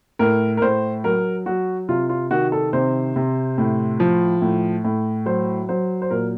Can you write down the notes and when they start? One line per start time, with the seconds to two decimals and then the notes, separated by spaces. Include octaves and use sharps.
0.19 A2 A#4
0.57 A#4
0.62 A2 C5
1.04 F#3 A#4
1.46 F#3 F#4
1.89 C3 F4
2.09 F4
2.31 D#3 F#4
2.52 A4
2.73 C3 C5
3.16 C3
3.58 A2
4.00 F3
4.42 A2
4.84 A2
5.26 F#3 C5
5.69 F#3 C5
6.02 C5
6.10 A#2 A#4